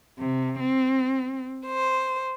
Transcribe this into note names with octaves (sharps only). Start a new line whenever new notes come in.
C3
C4
C5